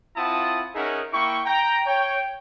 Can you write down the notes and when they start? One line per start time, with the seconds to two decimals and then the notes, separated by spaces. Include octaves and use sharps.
0.17 C4 E4 F4 F#5 A5 D#6
0.75 C#4 D#4 G#4 A#4 E5 F#5
1.13 A#3 E4 G5 C#6
1.46 G5 A#5
1.86 C#5 G5